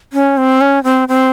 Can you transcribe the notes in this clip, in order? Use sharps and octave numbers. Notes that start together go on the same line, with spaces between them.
C#4
C4
C#4
C4
C4